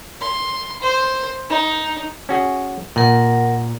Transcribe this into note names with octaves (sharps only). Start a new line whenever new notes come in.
C6
C5
D#4
C#4 F#4 G#4
A#2 A#4 F#5